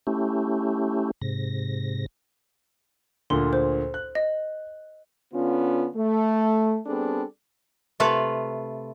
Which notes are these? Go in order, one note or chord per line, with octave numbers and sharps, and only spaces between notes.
A3 C#4 E4 G4
G#2 C3 A#6
D2 A#2 C6
C5
F#6
D#5
D3 B3 C#4 F4
A3
G3 B3 C4 D4 G#4 A4
C3 A3 F4 B4 F5